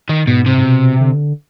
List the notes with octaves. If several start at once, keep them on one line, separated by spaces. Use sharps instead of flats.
D#3
G#2 B2
C3
G#2
B2
D3